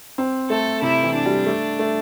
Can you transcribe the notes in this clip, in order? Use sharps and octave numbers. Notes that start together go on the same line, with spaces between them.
C4
A3 A4
C3 E4
E3
D4
G3
A3
A3